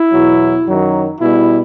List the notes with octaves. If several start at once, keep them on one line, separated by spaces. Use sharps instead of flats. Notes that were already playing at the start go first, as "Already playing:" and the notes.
Already playing: E4
E2 B2 F#3
F#2 D#3 F#3
B2 G3 E4